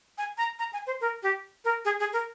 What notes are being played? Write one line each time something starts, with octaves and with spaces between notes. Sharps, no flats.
G#5
A#5
A#5
G#5
C5
A#4
G4
A#4
G#4
G#4
A#4